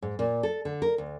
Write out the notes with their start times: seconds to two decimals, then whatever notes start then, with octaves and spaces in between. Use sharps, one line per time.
0.02 G#2
0.19 A#2
0.43 A4
0.65 D3
0.82 A#4
0.98 D2